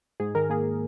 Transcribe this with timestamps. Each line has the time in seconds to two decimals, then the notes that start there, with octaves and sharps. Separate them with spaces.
0.20 G#2 G#4
0.35 D#3 A#4
0.50 A#3 G#4